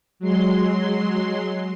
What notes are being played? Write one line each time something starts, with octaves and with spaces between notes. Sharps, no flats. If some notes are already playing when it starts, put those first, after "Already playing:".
F#3 G#3 C6